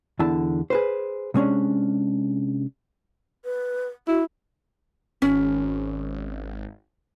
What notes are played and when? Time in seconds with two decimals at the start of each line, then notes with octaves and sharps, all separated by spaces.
0.19 E2 D3 E4 A5
0.70 G#4 B4 C5
1.34 C3 G#3 C#4 D4
3.45 B4
4.08 E4 F#4
5.22 G#1 C#4